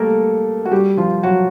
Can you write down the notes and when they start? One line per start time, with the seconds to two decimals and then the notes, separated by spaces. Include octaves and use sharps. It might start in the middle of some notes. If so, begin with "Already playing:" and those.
Already playing: G3 A3 A#3 A4 A#4
0.65 F#4
0.71 G3 G4
0.97 F3 F4
1.23 F#3 F#4